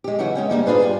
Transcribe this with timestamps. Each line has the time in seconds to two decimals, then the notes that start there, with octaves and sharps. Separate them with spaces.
0.04 G#3 G4
0.19 C#3 E3 F#3 F#4
0.35 G#3 C#4 G5
0.50 C#3 G3 A#3 D4
0.66 D4 F4 G#4 B4 C5
0.80 G2 G#5